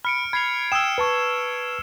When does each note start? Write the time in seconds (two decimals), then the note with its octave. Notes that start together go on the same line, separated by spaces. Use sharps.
0.05 B5 F6 C#7 D7
0.33 B5 G#6 C7 F7
0.72 G5 D#6 E6 E7
0.98 B4 A5 C#6